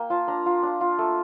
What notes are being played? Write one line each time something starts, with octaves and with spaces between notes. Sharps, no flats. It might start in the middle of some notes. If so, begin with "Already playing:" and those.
Already playing: A#3 G5
F4 A5
D4 A#5
F4
D4
F4
A3